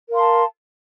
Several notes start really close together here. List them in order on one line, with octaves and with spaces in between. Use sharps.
A#4 F5 C6 A5